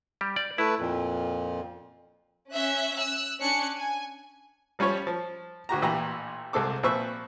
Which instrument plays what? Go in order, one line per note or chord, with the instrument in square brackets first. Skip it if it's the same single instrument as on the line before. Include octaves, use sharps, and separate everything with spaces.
[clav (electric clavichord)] G3 G4
D5
[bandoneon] A3 B4 [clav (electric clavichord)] E4
[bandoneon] F2 A#2
[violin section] C#4 E5 F#6
E6 F#6
C#4 D4 G#5 F#6 C#7
G#5
[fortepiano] F3 G3 C#4 F4 C#5
F3
D2 F#4 G4 A#5
A1 A#2 E3 G4 A#5
C2 G#3 C4 A4 D6
A#2 F3 C4 B4 E5 C#6